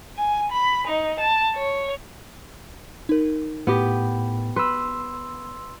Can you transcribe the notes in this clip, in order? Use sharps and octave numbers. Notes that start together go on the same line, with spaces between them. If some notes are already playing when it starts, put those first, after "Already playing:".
G#5
B5
D#4
A5
C#5
D#4 A#4
A2 B3 G4
B4 C6 E6